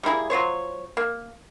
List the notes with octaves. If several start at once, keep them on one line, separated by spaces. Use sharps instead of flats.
G3 A#3 E4 G#4
F#3 F4 C5 C#5
A#3